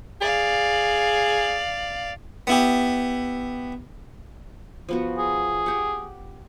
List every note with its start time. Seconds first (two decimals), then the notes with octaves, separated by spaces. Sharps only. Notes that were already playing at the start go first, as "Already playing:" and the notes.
0.21 G#4 D5 F5
2.47 B3 E4 G4
4.89 F3 B3 F#4
5.18 G#4
5.66 G4 F#5